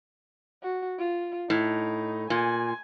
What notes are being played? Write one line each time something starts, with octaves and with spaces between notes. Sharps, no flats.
F#4
F4
A2 D#4
A#2 G#5